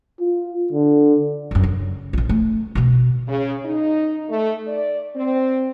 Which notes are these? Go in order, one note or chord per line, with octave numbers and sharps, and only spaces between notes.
F4
D3
C#2 F#2
C#3
A#1 D#3
A3
B2 D3
C#3
D#4
A3
D5
C4